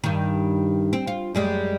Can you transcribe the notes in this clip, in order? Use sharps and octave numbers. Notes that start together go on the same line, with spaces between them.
G2 D#3
C4
F4
F#2 G3 G#3